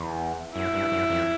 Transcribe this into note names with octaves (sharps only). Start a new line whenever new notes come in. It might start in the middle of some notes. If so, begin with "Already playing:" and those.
Already playing: E2
F#2 E4
G2
F#2
F2